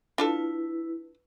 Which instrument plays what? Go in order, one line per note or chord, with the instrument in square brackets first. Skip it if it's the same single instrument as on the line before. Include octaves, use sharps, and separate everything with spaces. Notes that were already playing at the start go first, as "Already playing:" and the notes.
[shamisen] D4 F4 A4 [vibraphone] E4 B4